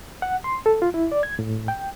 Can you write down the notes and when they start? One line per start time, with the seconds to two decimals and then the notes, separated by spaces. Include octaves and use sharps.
0.22 F#5
0.44 C6
0.66 A4
0.82 F4
0.94 E4
1.12 D5
1.23 G#6
1.39 A2
1.68 G5